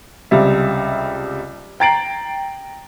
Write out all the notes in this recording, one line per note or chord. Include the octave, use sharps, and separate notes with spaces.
C#2 C3 G3 E5
G5 A#5 A6 C7 D7 F#7